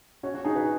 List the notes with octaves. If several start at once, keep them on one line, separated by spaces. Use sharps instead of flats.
C#4 F#4
C#4 F#4
D#4 G#4
F#4 B4